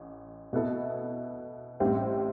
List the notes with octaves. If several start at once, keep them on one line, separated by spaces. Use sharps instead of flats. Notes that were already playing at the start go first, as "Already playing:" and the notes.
Already playing: A1
B2 B3 E4 A4
A1 A2 G3 C4